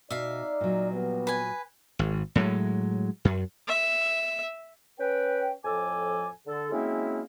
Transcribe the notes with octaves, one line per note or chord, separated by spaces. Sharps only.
B2 D#4 D5 E5 F5
A#2 F#3
G3 B3
B4 G#5
G#1
A2 F#3 G#3
F#2
E5
C#4 B4 G5
F2 A2 F3 A4 G#5 D6
D3 A4
F#3 G#3 A#3 C4 C#4 E4